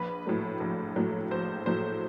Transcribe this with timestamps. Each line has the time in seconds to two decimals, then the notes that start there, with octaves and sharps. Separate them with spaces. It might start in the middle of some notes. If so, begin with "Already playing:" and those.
Already playing: A#1 B4
0.26 A2 F#3 A3
0.60 A#1
0.96 A2 F#3 A3
1.31 A#1 C5
1.66 A2 F#3 A3 C5